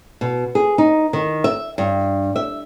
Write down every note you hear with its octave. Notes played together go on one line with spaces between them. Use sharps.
B2
G#4
D#4
D#3
E5
G2
E5